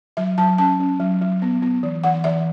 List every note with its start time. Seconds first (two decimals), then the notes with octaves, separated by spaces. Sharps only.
0.17 F#3 E5
0.38 F#3 A5
0.58 C#4 A5
0.80 C#4
1.00 F#3
1.21 F#3
1.42 B3
1.62 B3
1.83 E3
2.04 E3 F#5
2.24 E3 E5